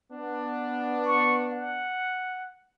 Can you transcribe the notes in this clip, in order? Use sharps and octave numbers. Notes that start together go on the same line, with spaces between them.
B3 D4
C#6
F#5